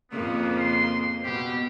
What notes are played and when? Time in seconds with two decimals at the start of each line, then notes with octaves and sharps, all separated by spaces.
0.11 F2 C#3 A#3 B3
0.59 C6
1.24 B2 G4